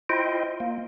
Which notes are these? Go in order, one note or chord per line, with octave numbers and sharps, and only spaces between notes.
E4 F4 C5 D#5 G5
A#3